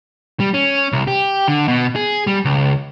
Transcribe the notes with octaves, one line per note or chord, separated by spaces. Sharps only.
G3
C#4
C2
G4
D3
B2
G#4
G3
C#2